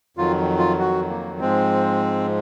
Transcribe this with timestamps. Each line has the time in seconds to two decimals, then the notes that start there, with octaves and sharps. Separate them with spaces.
0.17 F2 D#3 F#3 F4
0.58 F4
0.79 F#4
1.10 A#3
1.40 G#2 F3 G#3 C4